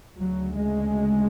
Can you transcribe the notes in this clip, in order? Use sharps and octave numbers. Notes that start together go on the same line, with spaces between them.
D2 C#3 F#3
G#3